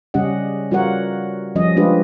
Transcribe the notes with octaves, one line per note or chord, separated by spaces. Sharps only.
C#3 G3 C#4 G4 D#5 F#5
G3 F4 F#4 A#4 C#5 F#5
F3 G3 C#4 D#5
G#3 D4 F4 G4 B4 D#5